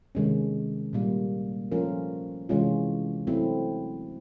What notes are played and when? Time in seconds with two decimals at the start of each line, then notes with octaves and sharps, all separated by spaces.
0.15 C3 D#3 G#3 C#4
0.93 A#2 G3 A#3
1.72 F3 A3 C#4 F4 A#4
2.49 C3 E3 G#3 C#4 F4
3.27 F#3 A3 C4 E4